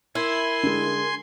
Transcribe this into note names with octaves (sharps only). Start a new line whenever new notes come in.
E4 A#4 G#5 C6
D3 G#3